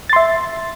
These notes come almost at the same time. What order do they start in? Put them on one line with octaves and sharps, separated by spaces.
A6 C6 E5